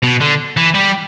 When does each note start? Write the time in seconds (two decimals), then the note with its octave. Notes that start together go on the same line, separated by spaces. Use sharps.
0.03 B2
0.21 D3
0.57 E3
0.74 G3